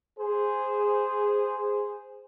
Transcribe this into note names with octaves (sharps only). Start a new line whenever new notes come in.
G#4 C5